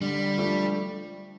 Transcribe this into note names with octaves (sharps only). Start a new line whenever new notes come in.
D3 G3
F3 A3 D4 A4